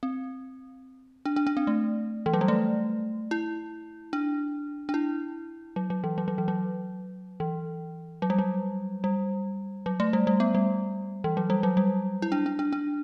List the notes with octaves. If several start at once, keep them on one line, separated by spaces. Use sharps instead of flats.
C4
D4
D4
D4
C4
A3
E3
F#3
G3
A3
E4
D4
D4
E4
F#3
F#3
E3
F#3
F#3
E3
F#3
E3
F#3
G3
F#3
G3
F#3
A3
G3
G3
B3
G3
E3
F#3
G3
F#3
G3
E4
D4
D4
D4
D4